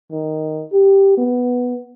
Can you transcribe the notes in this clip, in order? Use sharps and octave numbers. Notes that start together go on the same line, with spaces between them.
D#3
G4
B3